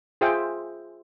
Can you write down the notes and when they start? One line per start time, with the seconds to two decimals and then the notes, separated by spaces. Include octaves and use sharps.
0.21 F4 G#4 C5 E5 G5